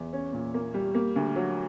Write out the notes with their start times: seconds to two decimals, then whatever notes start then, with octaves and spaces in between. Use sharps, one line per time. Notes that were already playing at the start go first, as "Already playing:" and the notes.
Already playing: E2
0.13 C#4
0.33 A#2
0.54 A#3
0.74 G3
0.95 A#3
1.16 D2
1.36 F#3